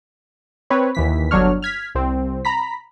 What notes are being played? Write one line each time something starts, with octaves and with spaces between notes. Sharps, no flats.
C4 B4 C#5
D#2 E3 B6
G1 F#3 D4 C#5 F6
F6 G#6 B6
C2 C4
A#5 B5 B6